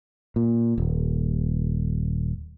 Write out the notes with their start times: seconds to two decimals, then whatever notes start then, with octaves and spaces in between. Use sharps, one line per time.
0.36 A#2
0.78 D#1